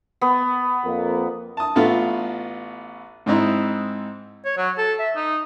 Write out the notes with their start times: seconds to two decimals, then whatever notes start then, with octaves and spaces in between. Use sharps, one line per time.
0.21 B3
0.84 F2 A#3
1.57 A5 D#6
1.76 A1 A3 B3 F4
3.26 G#2 C4 D#4 E4
4.45 C#5
4.58 F#3
4.78 A4
4.99 E5
5.16 D#4